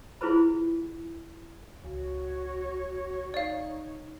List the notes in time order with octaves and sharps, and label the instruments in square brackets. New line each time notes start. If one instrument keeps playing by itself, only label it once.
[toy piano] E4 F4 G#4 B4 C5 B5
[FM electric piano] C#2 [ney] F#4 [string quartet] C#5
[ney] D#4 [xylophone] D5 F5